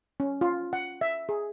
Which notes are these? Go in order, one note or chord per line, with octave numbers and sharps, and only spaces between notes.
C#4
F4
F#5
E5
G#4